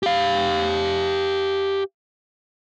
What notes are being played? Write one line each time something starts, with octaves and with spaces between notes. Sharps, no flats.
G4 F5